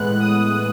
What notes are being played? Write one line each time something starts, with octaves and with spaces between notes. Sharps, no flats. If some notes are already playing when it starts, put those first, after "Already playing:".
Already playing: A2 E3 G#3 B3 F#6
D#6